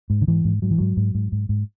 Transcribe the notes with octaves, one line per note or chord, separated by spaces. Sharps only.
G#2
D3
G#2 E3
G#2
G#2 F#3
E3
G#2 F#3
G#2
G#2
G#2
G#2